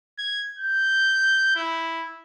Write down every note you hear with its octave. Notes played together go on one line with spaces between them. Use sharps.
G#6
G6
E4